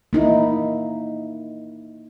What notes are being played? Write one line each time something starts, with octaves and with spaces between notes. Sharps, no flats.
A#3 D#4 E4